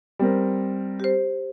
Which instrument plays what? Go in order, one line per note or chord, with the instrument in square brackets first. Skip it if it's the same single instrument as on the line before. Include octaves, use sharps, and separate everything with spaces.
[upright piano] G3 C4 A#4
[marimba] G4 C5